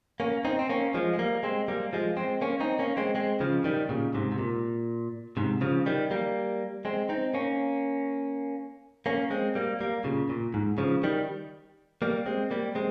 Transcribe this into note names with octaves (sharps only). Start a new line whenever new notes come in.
A#3 C#4
C4 D#4
C4
A#3 C#4
F3 G#3
G#3
G3 A#3
G#3 C4
G3 A#3
F3 G#3
G#3 C4
A#3 C#4
C4 D#4
A#3 C#4
G#3 C4
G#3 C4
C#3 F3
D#3 G3
A#2 C#3
G#2 C3
C3
A#2
G#2 C3
C#3 F3
D#3 G3
G3 A#3
G#3 C4
C4 D#4
A#3 C#4
A#3 C#4
G#3 C4
G3 A#3
G3 A#3
A#2 C#3
A#2
G#2
C#3 F3
D#3 G3
G3 A#3
G#3 C4
G3 A#3
G#3 C4